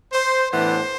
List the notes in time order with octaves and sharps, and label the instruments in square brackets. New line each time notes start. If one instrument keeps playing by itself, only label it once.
[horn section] C5
A2 E3 B3 D4 C5